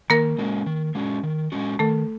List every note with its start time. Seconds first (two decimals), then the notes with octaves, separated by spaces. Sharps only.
0.10 D#3 A#3 A#4
0.38 G#3 C#4 F#4
0.66 D#3
0.95 G#3 C#4 F#4
1.23 D#3
1.52 G#3 C#4 F#4
1.79 D#3 A3 A4